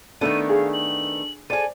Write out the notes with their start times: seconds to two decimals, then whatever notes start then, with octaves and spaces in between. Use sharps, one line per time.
0.21 D#3 A3 B3 D4 A4 D#7
0.49 G#4 F5
0.73 F#7
1.50 G#4 A4 C5 D5 D#7